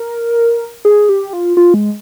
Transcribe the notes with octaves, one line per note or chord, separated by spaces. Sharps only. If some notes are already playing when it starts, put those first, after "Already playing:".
Already playing: A#4
G#4
G4
F4
F4
G#3